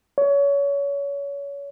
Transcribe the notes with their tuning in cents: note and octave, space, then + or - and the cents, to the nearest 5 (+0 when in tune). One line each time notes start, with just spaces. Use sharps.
C#5 +25